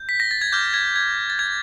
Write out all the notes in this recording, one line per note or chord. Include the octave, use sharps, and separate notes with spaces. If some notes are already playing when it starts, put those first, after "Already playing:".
Already playing: G6
B6
A#6
A6
G#6
D6 F6 G6
G#6
G#6
A6
G#6